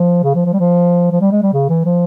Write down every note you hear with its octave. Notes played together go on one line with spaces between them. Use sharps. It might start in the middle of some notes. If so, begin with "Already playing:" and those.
Already playing: F3
C#3
F3
F3
G3
F3
F3
G3
G#3
G3
C#3
E3
F3